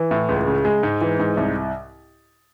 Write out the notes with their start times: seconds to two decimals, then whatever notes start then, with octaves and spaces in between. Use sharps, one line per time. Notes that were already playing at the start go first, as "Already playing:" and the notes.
Already playing: E3
0.11 A2
0.29 C#2
0.47 C#3
0.65 G#3
0.83 G#2
1.01 E3
1.19 G#2
1.37 C2